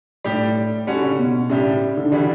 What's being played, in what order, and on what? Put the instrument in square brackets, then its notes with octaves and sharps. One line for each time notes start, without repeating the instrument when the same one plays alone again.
[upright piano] A2 [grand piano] G3 D4 G4
[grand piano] D3 G3 C#4 F#4
[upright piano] C#3
B2
[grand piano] A2 G3 D4 G4 [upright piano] C#3
[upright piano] D3
[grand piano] C#3 E3 G3 D4 F#4